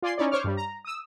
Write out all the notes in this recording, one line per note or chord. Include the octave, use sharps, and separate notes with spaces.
F4 D5 G#5 C6
C#4 D#4 E4 C#5 D5
C5 C#5 C#6 D6 F6
G2 G3
A#5
D#6 E6